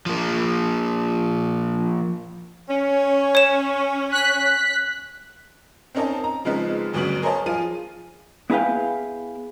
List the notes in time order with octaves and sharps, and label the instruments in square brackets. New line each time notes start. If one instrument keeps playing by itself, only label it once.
[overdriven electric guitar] F3 A#3
[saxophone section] C#4
[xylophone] C#5 E7
[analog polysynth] F#6 B6
[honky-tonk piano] C4 C#4 D#4 A#4 D#5 A5
A#5
C#3 F3 G#3 B3 C4 D#4
G1 D2 C#3 F#3 B3 F#7
G#4 A#4 C5 C#5 D#5 A5
F3 F4 G#4 D#7
[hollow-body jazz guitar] B3 E4 G#4 B4 F5 G5